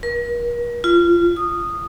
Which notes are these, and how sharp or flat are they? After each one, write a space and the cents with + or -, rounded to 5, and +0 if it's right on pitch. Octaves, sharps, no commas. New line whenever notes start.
A#4 +40
F4 -20
D#6 -10